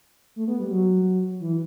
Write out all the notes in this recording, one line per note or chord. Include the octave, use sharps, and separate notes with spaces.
A3
B3
G3
F#3
E3